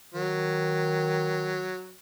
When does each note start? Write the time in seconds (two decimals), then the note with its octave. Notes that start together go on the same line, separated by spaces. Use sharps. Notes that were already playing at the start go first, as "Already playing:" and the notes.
0.14 D#3 F#3